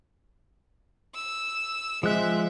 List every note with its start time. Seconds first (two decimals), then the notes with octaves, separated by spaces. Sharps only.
1.15 E6
2.03 F3 G#3 C4 E5 F#6